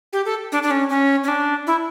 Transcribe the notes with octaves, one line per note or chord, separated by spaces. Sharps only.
G4
A4
D4
D4
C#4
C#4
C#4
D4
E4